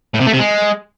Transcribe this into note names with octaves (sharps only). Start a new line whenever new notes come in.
A2
C3
A3
C3
G#3